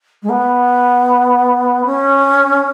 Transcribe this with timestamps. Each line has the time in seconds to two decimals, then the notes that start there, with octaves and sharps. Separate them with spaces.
0.23 G#3
0.30 B3
1.86 C#4